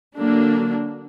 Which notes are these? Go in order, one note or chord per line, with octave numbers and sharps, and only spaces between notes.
D3 F#3 A#3 D4